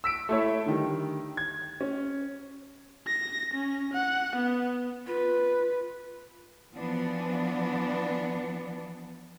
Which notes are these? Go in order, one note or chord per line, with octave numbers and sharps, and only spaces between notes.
E6 B6 D7
A3 E4 C#5
D3 D#3 G3
G#6
C#4
A#6
C#4
F#5
B3
F4 B4
E3 F3 B3 D4